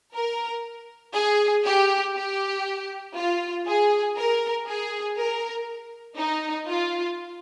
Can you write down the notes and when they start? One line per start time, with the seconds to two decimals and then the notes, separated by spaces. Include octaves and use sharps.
0.14 A#4
1.15 G#4
1.65 G4
2.16 G4
3.16 F4
3.66 G#4
4.16 A#4
4.67 G#4
5.16 A#4
6.18 D#4
6.67 F4